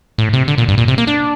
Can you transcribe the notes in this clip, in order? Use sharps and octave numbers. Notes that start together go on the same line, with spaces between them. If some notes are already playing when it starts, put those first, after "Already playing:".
A2
C3
D3
A#2
G2
A#2
C3
A#3
D4